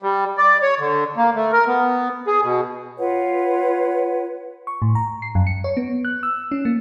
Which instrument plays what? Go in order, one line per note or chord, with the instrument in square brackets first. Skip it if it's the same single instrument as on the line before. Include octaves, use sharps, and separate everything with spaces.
[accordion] G3
D5
C#5
D3
A#3
A3
A#4
B3
G#4
B2
[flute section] F4 B4 C#5 F#5
[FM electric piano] C#6
A2
A#5
C7
F#2
C#7
C#5
B3
F#6
E6
C#4
A#3